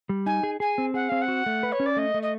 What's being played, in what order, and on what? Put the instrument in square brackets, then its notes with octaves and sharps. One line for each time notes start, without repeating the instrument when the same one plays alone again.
[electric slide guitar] G3
[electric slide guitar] D#4 [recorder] G#5
[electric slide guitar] G#4
[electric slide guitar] G#4 [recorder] G#5
[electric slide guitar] C4
[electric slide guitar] G#4 [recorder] F#5
[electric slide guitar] C4 [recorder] F5
[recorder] F#5
[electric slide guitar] F#4
A3
B4
[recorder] C#5
[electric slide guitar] C#4
[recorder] D5
[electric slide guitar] A3 [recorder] D#5
[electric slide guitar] A3
[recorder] D#5